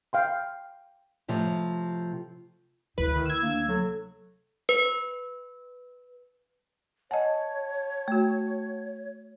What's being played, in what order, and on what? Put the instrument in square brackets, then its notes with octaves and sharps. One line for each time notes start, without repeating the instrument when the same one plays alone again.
[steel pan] F5 G5 C6
[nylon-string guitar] A2 C3 F3
[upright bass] D2 C3 [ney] E4 [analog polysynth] B4
[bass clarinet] D#3
[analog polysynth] E6 G#6
[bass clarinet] A#3 [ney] D4
[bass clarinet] F#3 [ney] A4
[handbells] B4
[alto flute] C#5 [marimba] D#5 G#5 [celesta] F#5 A5
[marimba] A3 F#4